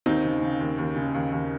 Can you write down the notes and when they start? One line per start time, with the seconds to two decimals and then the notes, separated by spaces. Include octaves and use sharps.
0.06 D#2 C4 D#4
0.24 C#3
0.42 C#3
0.60 D#2
0.78 D#2
0.96 C#3
1.15 D#2
1.32 D#2